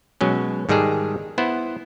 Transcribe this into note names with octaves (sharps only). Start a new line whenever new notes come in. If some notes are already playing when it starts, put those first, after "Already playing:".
B2 F#3 G#3 C#4
G#2 D#3 G3 G#3 G#4 A4
B3 E4 C5 F#5